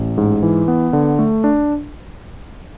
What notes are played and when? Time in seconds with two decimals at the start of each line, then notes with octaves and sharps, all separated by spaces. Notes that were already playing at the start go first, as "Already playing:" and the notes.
Already playing: A1
0.18 G#2
0.43 E3
0.68 B3
0.93 D3
1.19 A3
1.44 D4